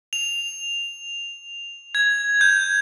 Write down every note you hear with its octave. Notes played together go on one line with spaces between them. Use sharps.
F7
G#6
G6